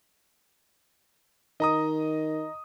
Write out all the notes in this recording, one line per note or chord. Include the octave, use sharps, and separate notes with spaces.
D#3 D#5 A#5 D#6